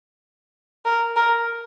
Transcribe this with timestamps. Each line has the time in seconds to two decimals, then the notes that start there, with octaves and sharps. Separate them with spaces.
0.85 A#4
1.16 A#4